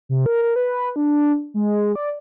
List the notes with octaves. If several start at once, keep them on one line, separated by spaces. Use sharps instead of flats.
C3
A#4
A#4
B4
D4
G#3
D5